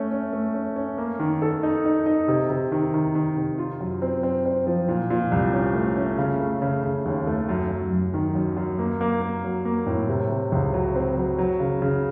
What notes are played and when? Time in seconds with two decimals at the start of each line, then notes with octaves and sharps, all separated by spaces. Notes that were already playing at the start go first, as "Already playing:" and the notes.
Already playing: A3 C#4
0.12 C#4
0.33 A3
0.54 C#4
0.76 C#4
0.98 A#3
1.19 D#3
1.42 A4
1.63 D#4
1.85 D#4
2.06 D#4
2.28 C3
2.50 C3
2.72 D#3
2.94 D#3
3.15 D#3
3.36 C3
3.58 F4
3.81 F#2
4.02 C4
4.23 C4
4.45 C4
4.67 F3
4.88 A#2
5.10 A#2
5.32 C2
5.54 C#4
5.75 A3
5.97 C#4
6.18 C#3
6.40 A3
6.62 C#3
6.84 C#3
7.05 D#2
7.27 A3
7.49 F#2
7.70 F#2
7.92 F#2
8.14 D#3
8.35 F#2
8.57 F#2
8.79 A#3
9.01 A#3
9.22 A#3
9.44 F#3
9.65 A#3
9.87 A2
10.09 C3
10.30 C3
10.52 C#2
10.74 F#3
10.95 C4
11.18 F#3
11.38 F#3
11.60 C#3
11.82 C#3